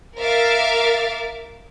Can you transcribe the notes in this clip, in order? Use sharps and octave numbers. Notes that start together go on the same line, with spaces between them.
A#4 E5 F5 D6 A6